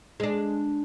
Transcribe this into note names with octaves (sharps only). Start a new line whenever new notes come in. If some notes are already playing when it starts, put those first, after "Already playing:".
G#3 D4